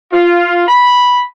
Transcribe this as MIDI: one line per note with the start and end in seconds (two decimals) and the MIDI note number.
0.13 0.65 65
0.67 1.23 83